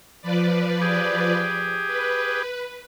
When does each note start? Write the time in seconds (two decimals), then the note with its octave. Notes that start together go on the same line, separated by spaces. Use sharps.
0.22 F3 B4 D5
0.82 G4 G#4
1.87 B4